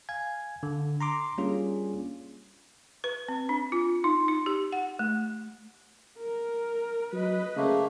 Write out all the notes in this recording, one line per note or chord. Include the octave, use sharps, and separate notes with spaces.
F5 G#5 G#6
D3
A#5 C6 D6
G3 A#3 C#4 D4 F4 G#4
B4
C4
D4
F4
D#4
D#4
G4
F#5
A3
A#4
F#3 B4 D#5
C#3 A3 A#3